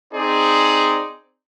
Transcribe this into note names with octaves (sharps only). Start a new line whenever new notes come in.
C4 D#4 G#4 C5 D5